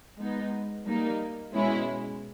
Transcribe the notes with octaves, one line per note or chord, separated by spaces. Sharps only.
G#3 B3 D#4
G3 A#3 D#4
B2 G#3 C#4 E4